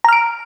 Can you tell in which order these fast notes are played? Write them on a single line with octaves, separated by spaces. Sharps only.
A#5 F6 D7